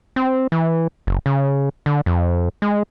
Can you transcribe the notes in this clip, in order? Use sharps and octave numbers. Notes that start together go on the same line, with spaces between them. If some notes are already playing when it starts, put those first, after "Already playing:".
C4
E3
F#1
C#3
D3
F2
G#3